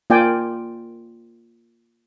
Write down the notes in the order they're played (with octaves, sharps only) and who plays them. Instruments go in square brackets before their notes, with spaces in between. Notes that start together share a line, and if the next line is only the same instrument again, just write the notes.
[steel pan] A#3 F4 D5 G5 G#5